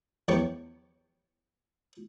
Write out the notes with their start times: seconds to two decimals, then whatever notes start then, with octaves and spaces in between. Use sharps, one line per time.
0.28 E2 G3 G4 C#5 C#6